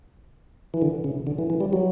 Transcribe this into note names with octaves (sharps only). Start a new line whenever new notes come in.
E3
D3
C#3
D3
E3
E3
G3
F#3